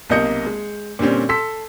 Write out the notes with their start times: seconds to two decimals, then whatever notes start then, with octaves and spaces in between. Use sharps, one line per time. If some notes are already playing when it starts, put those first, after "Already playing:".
0.10 B1 C3 A#3 D#5 G6 C#7
0.46 G#3
0.99 A#2 D3 G3 C4 C#4
1.29 A4 C6 E6 B6